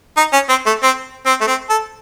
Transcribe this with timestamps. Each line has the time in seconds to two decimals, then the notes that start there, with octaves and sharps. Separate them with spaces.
0.17 D#4
0.33 C#4
0.49 C4
0.66 A3
0.83 C4
1.26 C4
1.41 A3
1.47 C4
1.69 A4